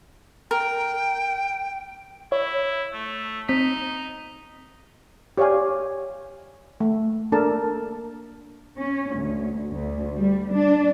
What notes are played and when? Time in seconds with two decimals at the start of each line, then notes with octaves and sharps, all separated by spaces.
0.51 A#4 G5
2.32 E4 C#5
2.94 A3
3.49 C4 D#4 B6
5.38 G4 C#5 D5 F5 G#5
6.80 A3
7.32 A#3 D4 A4 A#4 A5
8.79 C#4
9.17 D2
9.72 D2
10.17 G3
10.52 D4